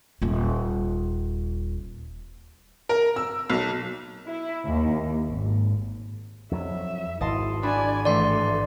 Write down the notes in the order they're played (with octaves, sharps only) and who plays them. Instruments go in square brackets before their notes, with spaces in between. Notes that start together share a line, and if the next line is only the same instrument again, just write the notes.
[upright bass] D#1 F4
[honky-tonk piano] A#4
E6
B1
[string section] E4
D#2
G#1
[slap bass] F2 F#3 [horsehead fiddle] E5
[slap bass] G#1 [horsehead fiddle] E4 [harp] D#5 A5 C6
[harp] D4 F#4 B5 [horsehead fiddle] D5 G#5
[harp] A1 [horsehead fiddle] A3 [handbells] D5 C6